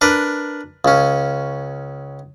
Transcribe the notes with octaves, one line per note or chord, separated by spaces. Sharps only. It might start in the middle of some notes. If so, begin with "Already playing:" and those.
D4 A#4 B4
C#2 C#4